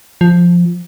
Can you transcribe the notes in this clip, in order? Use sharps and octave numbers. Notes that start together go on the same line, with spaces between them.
F3